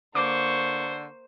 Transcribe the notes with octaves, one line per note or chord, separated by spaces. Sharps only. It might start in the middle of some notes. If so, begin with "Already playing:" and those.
D3 A#3 C5 C#6 D6